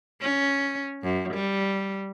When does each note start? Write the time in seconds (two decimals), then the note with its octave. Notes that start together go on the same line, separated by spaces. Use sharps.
0.21 C#4
1.03 F#2
1.34 G3